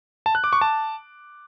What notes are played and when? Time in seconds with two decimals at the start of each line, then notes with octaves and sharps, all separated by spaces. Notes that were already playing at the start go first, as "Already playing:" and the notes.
0.26 A5
0.35 F#6
0.44 D6
0.53 C#6
0.61 A5